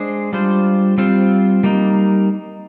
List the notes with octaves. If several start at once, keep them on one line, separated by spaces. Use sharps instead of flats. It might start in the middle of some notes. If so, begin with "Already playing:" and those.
Already playing: G#3 D4 G#4 C5
G3 D4 F4 C5
G3 C4 F4 C5
G3 A#3 D#4